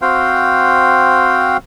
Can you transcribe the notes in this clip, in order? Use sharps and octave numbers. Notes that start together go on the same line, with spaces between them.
C4 F#4 C5 F5 G5